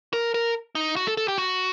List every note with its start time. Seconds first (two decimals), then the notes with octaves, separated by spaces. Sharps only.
0.13 A#4
0.34 A#4
0.75 D#4
0.96 F#4
1.07 A4
1.17 A4
1.28 G4
1.38 F#4